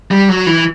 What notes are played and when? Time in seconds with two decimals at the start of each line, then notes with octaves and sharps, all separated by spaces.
0.11 G3
0.29 F#3
0.47 E3